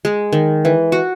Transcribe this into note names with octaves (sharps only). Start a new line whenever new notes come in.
G#3
D#3
E3
F#4